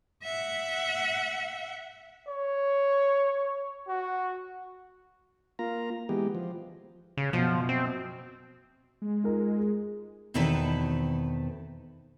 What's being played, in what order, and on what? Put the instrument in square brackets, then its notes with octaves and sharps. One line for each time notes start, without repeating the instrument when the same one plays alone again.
[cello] E5 F#5
[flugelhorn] C#5
F#4
[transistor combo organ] A#3 F4 A#5
E3 G#3 B3 G4
F3
[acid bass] C#3
[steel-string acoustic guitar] F#2 B2 [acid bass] F3
[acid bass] C4
[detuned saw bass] G#3
[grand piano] D#4 F4 A#4
G#4
[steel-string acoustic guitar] E2 B2 D#3 C4 A4 B4